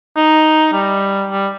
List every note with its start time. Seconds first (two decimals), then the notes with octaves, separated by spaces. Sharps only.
0.16 D#4
0.73 G3
1.31 G3